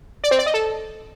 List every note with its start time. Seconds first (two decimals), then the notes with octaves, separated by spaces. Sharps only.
0.24 D5
0.31 C4
0.39 D5
0.46 D#5
0.54 A4